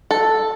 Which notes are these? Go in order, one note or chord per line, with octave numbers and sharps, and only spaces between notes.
A4